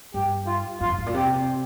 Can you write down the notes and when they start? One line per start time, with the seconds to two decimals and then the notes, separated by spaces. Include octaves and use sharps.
0.14 G2 G4
0.47 F4
0.80 F2 F4
0.89 G2
0.98 G#2
1.06 A#2
1.14 C3 G4